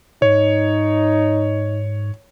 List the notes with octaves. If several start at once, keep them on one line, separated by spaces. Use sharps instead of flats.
G#2 D#4 C#5